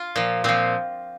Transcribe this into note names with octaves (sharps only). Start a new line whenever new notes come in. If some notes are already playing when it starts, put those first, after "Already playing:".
Already playing: F4
A#2 F3
A#2 F3 C4